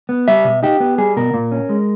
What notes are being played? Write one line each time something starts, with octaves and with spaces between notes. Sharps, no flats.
B3
G3 E5
B2
D#4 G4
B3
G3 G#4
B2 A#4
A#2
C#4
G#3